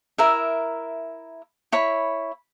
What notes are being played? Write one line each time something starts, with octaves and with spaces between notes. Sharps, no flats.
E4 A#4 E5
E4 C#5 B5